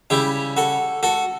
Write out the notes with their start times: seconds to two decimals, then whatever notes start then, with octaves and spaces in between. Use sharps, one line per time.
0.10 C#3 G3 E4 G4
0.57 F#4 A4
1.03 F#4 A4